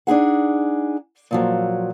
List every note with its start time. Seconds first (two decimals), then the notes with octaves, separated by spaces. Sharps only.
0.07 D4 D#4 G#4 F#5
1.31 A#2 F3 F#3